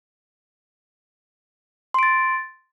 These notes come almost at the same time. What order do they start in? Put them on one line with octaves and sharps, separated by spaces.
C6 D7 A6